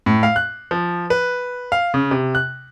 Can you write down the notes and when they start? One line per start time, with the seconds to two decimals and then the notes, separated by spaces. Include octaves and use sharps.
0.06 A2
0.23 F5
0.36 F#6
0.71 F3
1.10 B4
1.72 F5
1.94 C#3
2.11 C3
2.35 F#6